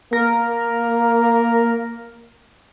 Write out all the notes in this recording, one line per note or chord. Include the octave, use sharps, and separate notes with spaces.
A#3 A#4